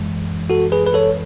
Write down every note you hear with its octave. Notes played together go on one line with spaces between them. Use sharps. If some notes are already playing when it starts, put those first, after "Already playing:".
Already playing: F#2 E3 G#3
F#4 A4
G#4 B4
B4
A4 C#5